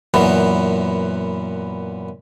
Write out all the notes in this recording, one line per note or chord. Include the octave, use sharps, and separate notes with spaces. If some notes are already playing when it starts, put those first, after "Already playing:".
F#2 A#2 E3 B3